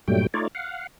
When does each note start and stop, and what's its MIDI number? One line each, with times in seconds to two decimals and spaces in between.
0.08 0.27 43
0.08 0.27 46
0.08 0.27 54
0.08 0.27 55
0.08 0.27 57
0.08 0.27 79
0.34 0.48 57
0.34 0.48 63
0.34 0.48 65
0.34 0.48 73
0.34 0.48 74
0.55 0.87 77
0.55 0.87 78